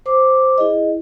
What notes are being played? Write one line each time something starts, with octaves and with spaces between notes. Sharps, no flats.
C5 D6
E4 G#4 D#5